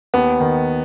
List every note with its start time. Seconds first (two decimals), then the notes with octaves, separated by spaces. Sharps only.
0.14 D#2 B3
0.40 D#3